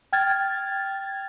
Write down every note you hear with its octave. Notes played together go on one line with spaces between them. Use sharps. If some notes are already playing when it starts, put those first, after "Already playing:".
G5 F6 G#6 A6